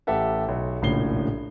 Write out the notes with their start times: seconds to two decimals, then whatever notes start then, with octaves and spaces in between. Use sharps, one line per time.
0.07 A1 G4 A4 E5 F#5
0.48 B1
0.82 E1 A#1 A2 C#3 C7 G7